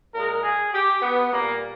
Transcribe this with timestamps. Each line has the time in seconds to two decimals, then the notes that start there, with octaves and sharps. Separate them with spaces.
0.14 A#2 G#3 A#4
0.43 G#4
0.73 G4
1.02 B3
1.32 A#2 G3 A#3